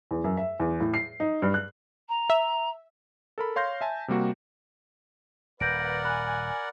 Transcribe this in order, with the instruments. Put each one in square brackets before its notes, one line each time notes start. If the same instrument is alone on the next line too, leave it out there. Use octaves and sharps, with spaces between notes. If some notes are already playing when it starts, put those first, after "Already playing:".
[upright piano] E2
F#2
E5
E2
A2
C7
D#4
G2
F#6
[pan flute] A#5
[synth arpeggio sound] E5
[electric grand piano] A4 A#4 B5
C#5 F5 C6 G6 A#6
E5 G#5 A5
C3 G3 A#3 F#4
[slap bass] D#1 [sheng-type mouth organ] A#4 D5 F#5 [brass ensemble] B4 [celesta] G6 A#6 D7
[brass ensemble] G#5 [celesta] B5 F#6